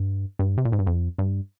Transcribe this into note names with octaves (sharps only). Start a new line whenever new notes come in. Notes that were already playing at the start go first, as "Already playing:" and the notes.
Already playing: G2
G2
C3
A#2
G#2
G2
F2
G2